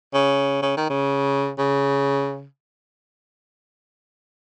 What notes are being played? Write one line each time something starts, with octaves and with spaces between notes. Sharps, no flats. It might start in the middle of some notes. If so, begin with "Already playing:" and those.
C#3
C#3
D#3
C#3
C#3